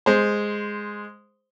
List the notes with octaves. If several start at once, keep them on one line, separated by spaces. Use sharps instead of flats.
G#3 C5